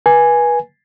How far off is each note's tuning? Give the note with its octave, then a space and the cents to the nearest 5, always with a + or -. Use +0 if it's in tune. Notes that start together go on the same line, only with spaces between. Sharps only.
B4 -30 G#5 +0